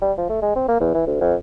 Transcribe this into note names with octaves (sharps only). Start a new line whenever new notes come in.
G3
F3
A3
G#3
C4
A#3
E2
E3
D2
F2